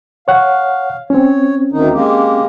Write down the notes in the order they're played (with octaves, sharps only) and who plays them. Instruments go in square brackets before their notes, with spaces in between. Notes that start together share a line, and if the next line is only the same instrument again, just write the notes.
[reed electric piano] C#5 F#5 [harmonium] F5
[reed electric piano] C4 C#4 [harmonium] C#5
[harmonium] D2 D#3 D#4
G#3 A#3 G4